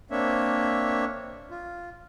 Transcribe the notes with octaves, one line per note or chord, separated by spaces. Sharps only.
A#3 C4 D4 C#5 E5
F4